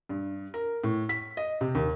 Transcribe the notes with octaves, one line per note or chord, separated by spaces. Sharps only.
G2
A#4
A2
B6
D#5
C3
D#2